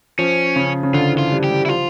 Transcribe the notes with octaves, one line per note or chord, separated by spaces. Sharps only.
F3 C#4
C#3
C#3
D3 F4
E3
F4
G3
G4
G3
E4
F3 F4